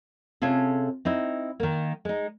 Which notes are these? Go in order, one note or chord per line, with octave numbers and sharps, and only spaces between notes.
C3 C#4 F4 G#4 A4
C4 D#4 E4
D#3 A#3
G#3 D#4